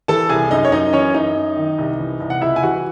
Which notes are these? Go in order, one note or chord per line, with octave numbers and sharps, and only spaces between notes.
E3 A4 A5
C2 G#4 G#5
F#2 D#4 D#5
C#5
F#2 D#4 D#5
E3 C#4 C#5
F#2 D#4 D#5
F#2
D#3
C2
E3
C2
F#5
C#2 E4 E5
G#5
E3 F#4 F#5